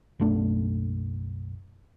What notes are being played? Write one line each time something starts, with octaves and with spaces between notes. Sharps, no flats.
F#1 B1 A3 D4